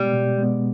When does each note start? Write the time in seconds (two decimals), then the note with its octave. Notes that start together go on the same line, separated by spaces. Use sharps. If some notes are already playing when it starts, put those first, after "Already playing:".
Already playing: B2 G3 G#3 B3
0.13 B2
0.38 G#3 B3